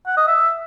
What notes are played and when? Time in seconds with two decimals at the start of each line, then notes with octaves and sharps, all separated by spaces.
0.07 F#5
0.17 D#5
0.28 E5